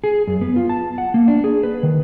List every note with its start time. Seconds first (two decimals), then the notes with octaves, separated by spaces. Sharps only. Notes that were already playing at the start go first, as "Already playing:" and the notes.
0.04 G#4
0.27 F#2
0.41 B3
0.56 F4
0.69 A5
0.98 F#5
1.14 A#3
1.28 D4
1.44 G#4
1.63 B4
1.83 D#3